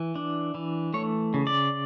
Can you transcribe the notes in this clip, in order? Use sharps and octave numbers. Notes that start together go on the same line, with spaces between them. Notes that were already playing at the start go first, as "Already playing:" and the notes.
Already playing: E3
D4
E3
A3 C#5
C#3
D5